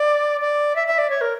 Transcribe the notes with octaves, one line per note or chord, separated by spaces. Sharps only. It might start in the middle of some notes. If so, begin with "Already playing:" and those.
Already playing: D5
D5
E5
E5
D5
C#5
A#4